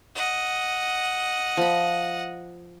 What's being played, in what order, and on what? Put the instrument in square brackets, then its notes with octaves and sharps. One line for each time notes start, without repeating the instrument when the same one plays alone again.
[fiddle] D#5 F#5
[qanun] F3 B5